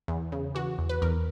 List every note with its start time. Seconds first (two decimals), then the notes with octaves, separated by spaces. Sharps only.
0.08 E2
0.32 C#3
0.55 E3 F#4
0.78 E2
0.89 B4
1.02 E2 A#4